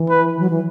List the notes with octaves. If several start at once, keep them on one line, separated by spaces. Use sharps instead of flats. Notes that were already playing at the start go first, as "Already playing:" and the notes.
Already playing: E3
B4
F#3
E3